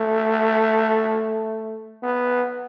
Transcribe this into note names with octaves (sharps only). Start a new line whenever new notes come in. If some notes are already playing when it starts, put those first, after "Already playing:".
Already playing: A3
B3